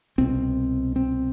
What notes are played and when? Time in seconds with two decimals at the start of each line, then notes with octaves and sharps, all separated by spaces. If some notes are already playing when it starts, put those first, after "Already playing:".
0.18 C2 B2 C4
0.96 C4